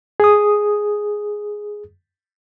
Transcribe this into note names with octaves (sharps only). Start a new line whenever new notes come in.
G#4 D#6